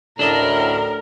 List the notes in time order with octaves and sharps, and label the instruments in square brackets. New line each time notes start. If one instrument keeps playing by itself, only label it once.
[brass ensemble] A1 D2 A2 [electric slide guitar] D4 D#5 [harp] A4 D5 [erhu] A#4